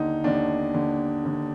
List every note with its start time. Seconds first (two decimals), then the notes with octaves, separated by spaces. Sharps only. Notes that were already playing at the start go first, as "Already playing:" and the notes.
Already playing: D#2 D3 D#4
0.24 D#2 D3 D4
0.74 D#2 D3
1.24 D#2 D3